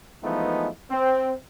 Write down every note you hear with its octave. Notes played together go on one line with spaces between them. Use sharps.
E3 F3 G#3 A3 B3 D#4
C4